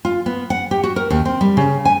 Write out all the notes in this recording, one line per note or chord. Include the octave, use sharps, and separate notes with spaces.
F4
B3
F#5
G4
F#4
A#4
D#2
C4
G3
C#3
G#5